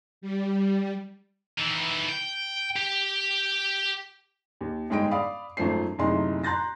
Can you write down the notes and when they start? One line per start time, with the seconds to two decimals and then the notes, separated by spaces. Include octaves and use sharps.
0.21 G3
1.58 D#3 E3
2.09 G5
2.76 G4
4.61 D#2
4.90 G1 G#2 G#3 G5 D7
5.11 D5 F5 B5 D#6
5.57 G#1 F#2 F3 A3 C5 C7
5.99 F#1 D2 C3 D#4 E4 C6
6.44 A#5 C6 F#6 G6 A6 A#6